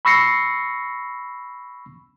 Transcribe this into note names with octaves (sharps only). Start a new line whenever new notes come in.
B5 C#6 E6 A#6 C7 C#7